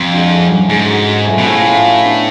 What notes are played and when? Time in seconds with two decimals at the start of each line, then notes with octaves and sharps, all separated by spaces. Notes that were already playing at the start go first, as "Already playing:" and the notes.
Already playing: F2
0.11 G#3 D4 F#4
0.30 A2
0.50 F#3 C#4
0.69 G#2 G#3
0.88 C#4 F#4
1.07 F#3
1.27 A3 F4 G#4
1.38 B2
1.46 A2 F3
1.66 A3 F4
1.85 F#3
2.05 B3 D4